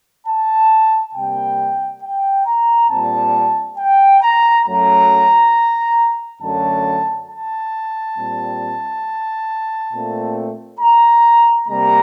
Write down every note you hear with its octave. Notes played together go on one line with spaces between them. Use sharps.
A5
C3 G3 A#3 G5
G5
A#5
A#2 G3 C4 A5
G5
A#5
F#2 F#3 A3 A#5
F#2 D3 F#3 A3 A5
A5
A#2 G3 C4
A#2 A3 C4
A#5
C3 G3 A#3 A#5